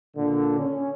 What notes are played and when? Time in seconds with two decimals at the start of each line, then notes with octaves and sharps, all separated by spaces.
0.17 A#2 D3
0.58 C#4